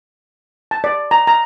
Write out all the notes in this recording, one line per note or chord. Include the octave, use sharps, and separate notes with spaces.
A5
D5
A#5
A#5